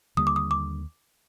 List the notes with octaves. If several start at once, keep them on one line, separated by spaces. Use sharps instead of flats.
D#2 D3 G3 A#3 D#6
D6
D#6
D6